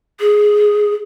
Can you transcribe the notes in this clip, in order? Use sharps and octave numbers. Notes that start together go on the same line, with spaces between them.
G#4